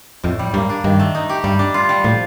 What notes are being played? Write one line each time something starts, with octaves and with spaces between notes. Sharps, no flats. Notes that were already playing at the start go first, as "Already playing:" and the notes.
F2 A2
G3
G2 A#3
D4
G2 D#3
A3
D#4
G4
G2 G3
D4
F4
G3
A2 F3